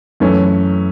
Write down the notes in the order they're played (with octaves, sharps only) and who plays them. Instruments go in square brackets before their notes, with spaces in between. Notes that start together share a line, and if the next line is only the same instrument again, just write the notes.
[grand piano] F#2 E3 A3 C#4